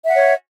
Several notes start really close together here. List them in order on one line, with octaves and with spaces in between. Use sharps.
E5 F#5 C#5